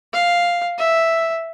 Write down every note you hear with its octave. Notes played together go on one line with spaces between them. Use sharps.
F5
E5